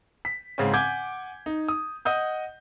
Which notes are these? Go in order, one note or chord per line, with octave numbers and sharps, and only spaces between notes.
B6
G#2 C#3 C4 C#4
F#5 G#5 D6 G6 G#6
D#4
D#6
D#5 F#5 D#6 G6